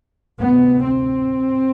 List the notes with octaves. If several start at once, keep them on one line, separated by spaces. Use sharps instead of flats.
D2 C3 B3
C4